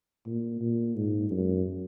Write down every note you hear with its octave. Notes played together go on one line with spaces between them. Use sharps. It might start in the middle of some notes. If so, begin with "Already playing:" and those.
A#2
A#2
G#2
F#2